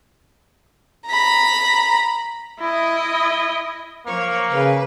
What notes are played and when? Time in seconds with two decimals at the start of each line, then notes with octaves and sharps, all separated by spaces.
1.06 A#5 B5
2.60 E4 D#5
4.06 F3 A#3 C#5
4.50 C#3 B4